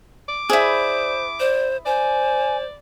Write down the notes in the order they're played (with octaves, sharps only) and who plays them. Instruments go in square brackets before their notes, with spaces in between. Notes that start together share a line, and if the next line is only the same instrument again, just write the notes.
[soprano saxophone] D6
[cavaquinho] E4 G#4 [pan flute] C5 [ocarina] D5
[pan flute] C5 [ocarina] D5
[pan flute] C5 [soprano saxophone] D5 [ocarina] G#5